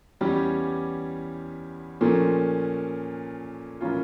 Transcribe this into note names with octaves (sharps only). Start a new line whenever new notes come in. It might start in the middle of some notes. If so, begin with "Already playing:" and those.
E2 E3 G3 C#4 G4
A#2 F3 A3 C#4
A2 E3 A#3 C#4 F4